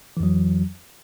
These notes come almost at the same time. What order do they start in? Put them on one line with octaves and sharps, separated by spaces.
E3 F2 F#3